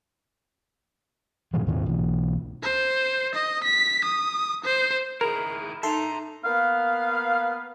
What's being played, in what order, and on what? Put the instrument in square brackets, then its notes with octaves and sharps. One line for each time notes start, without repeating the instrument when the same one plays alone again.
[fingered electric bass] A#2 D#3 F3
D#2 G#2 D#3 C4
B1 E3
[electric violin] C5
D#5
B6
D#6
C5
[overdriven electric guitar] D#3 E4 [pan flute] G#4 [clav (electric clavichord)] A#4
[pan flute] D#4 [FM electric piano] A4 C6 [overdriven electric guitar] E5 A#5
[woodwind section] A#3 B3 F5